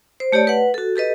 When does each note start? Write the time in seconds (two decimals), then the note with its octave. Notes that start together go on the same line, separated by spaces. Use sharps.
0.20 C5
0.32 A3 G4 C#5 D5 A5
0.47 B4 F#5
0.74 F#4 A4
0.96 G4 A4 B4 D#5